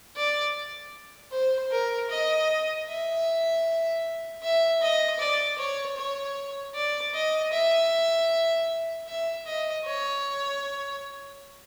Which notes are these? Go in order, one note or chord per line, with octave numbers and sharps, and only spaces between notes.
D5
C5
A#4
D#5
E5
E5
D#5
D5
C#5
C#5
D5
D#5
E5
E5
D#5
C#5